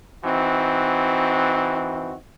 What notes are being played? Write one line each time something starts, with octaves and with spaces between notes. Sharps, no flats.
E3 C4 D#4 F#4